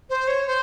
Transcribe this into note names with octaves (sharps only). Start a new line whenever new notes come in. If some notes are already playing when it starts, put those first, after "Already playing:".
C5
C#5
C5